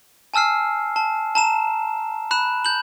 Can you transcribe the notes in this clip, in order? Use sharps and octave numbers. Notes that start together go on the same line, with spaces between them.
G#5 A5 E6 F6 C7
A5
A5 A#5 E7
B5 F#6 E7
G6 F#7